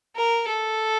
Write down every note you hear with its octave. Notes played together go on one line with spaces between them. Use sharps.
A#4
A4